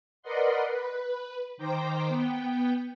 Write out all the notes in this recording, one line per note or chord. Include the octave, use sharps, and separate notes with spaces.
A#4 B4 D5 D#5 F#5 C6
B4
D#3 C5 G5 A#5 C6 D6
B3 G5